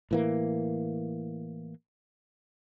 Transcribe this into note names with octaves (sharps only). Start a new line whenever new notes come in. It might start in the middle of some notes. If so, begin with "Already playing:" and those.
A2 E3 A#3